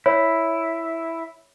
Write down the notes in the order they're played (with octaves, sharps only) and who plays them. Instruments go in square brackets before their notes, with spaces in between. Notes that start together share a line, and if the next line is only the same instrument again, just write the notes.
[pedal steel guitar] E4 [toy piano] C#5